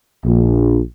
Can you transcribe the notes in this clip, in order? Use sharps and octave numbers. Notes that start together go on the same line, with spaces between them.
A#1